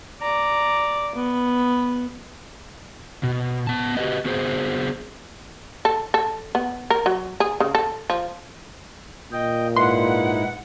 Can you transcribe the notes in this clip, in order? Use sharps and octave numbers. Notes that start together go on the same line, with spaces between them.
D5 A#5
B3
B2
B3 A5
F#4 G4 A4 B4 D#5
B3 F#4 G#4 C5
A4
A4
B3
A#4
F#3
G#4
C#3
A4
F3
A#2 D#5 G5
G#2 D#4 E4 B4 F#5 C6